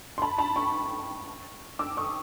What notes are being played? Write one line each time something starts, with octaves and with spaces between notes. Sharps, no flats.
C6
A5 B5
A5 B5
B5 C#6
D6 E6
C#6 D#6